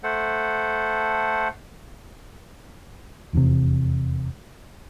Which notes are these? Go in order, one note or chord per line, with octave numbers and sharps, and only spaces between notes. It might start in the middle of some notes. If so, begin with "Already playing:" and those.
A3 A4 C5 F#5
F1 E2 A2 C3